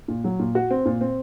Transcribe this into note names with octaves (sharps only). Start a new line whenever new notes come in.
A#2
F#3
A#2
F#4
C4
A#2
C4